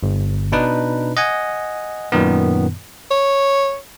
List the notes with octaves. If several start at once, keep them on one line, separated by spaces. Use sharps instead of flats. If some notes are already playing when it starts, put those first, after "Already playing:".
G1
B2 D4 D#4 B4
D#5 F#5 G#5
F#2 A#2 D#3 B3
C#5